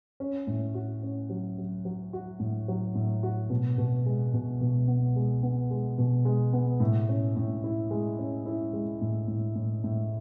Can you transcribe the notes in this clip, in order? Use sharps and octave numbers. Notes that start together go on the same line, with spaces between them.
C#4
A2
F#4
C#4
F#3
F#3
F#3
F#4
A2
F#3
A2
F#4
B2
B2
G#3
B2
B2
B3
G#3
B3
G#3
B2
G#3
B3
A2
C#4
A2
E4
G#3
C#4
E4
G#3
A2
A2
A2
A2